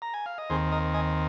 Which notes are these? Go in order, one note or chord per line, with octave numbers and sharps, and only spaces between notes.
A#5
G#5
F5
D#5
D#2 D#3 C4 G#4 C5
A#4 D#5
D#5 G#5